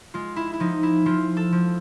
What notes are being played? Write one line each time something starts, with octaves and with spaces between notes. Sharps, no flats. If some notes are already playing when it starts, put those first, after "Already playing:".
G#3 F4
E4
E4
F3 D#4
E4
F3 F4
A4
F3